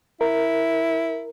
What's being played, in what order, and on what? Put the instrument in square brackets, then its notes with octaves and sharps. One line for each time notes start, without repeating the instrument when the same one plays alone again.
[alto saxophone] E4 [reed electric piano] A#4